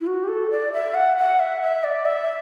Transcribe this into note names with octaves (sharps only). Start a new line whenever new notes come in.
E4
F#4
G4
A4
D5
E5
F#5
F#5
E5
E5
D5
E5